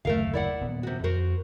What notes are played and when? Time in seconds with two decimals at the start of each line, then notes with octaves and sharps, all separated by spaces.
0.05 F#1 D#2 C3 A3 A#4 F5
0.33 E4 D5 F#5
0.61 D#1 B3
0.83 C3 F#4
1.04 F2 F#4 A#4 C5